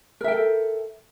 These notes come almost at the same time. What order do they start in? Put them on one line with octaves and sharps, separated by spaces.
A#4 E5 G5 A4